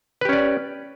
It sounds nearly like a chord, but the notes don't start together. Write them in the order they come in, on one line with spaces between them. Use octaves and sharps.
B4 G4 C#4 D5